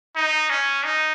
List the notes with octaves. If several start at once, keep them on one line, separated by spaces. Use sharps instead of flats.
D#4
C#4
D#4